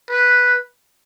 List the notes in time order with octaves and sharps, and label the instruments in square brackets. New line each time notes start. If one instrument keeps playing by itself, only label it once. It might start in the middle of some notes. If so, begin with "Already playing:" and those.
[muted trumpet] B4